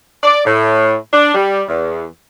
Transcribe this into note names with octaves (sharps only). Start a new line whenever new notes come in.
D5
A2
D4
G3
E2